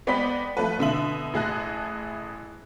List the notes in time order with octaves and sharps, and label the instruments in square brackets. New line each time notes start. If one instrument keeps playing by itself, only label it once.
[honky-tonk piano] G#3 B3 D5 G5 B5 B6
F3 A3 A4 B4
B2 D3 E5 F#7
A1 E4 G#4 D#5 A5 F#6